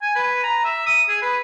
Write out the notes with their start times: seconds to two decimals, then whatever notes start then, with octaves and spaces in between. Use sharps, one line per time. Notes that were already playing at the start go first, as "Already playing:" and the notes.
0.02 G#5
0.16 B4
0.43 A#5
0.64 E5
0.86 D#6
1.09 G#4
1.22 B4